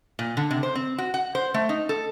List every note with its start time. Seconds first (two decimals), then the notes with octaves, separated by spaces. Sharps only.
0.19 A#2
0.37 D3
0.51 C3
0.63 C5
0.75 C4
0.98 F#4
1.14 F#5
1.35 C5
1.54 A3
1.69 D#4
1.89 A4